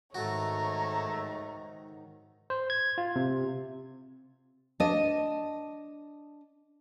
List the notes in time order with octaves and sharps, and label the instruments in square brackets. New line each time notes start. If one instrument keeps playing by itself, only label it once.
[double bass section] G#2 D#3 [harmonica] A3 [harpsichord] F#4 [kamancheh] C#5 A#5
[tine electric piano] C5
G#6
F4
C3
[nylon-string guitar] D4 D#5